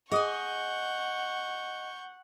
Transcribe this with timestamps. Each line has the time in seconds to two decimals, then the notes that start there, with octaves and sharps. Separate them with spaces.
0.12 G#4 D#5 F#5 G#5 C#6 D#6 G6